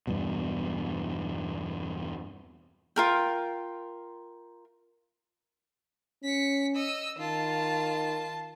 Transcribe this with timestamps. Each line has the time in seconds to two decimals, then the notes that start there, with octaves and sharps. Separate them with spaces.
0.07 E2 G2 B2
2.96 F4 A#4 G5
6.24 C#4 B6 C#7
6.75 D#5 E6
7.18 D#3 F4 A5